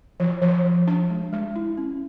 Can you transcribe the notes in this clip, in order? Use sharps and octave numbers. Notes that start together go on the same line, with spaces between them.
F3
F3
F3
D4
G#3
G#3
E4
C#4